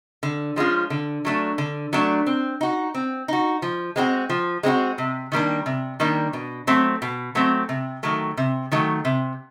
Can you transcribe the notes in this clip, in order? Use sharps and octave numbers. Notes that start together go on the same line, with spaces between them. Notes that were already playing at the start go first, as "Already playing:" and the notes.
D3
F3 G#3 C#4 F4
D3
F#3 A3 D4
D3
F#3 A3 D4
C4
D#4 F#4
C4
D#4 F#4
F3
G#3 C4 D#4 F#4
F3
G#3 C4 D#4 F#4
C3
D#3 G3 A#3 D4
C3
D#3 G3 A#3 D4
B2
F#3 A3 C4
B2
F#3 A3 C4
C3
D#3 F#3 A3
C3
D#3 F#3 A3
C3